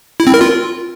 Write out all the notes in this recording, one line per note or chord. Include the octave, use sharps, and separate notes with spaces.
E4
C4
A#4
F4